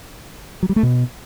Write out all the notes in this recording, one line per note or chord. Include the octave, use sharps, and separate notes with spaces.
F#3
G3
A3
B2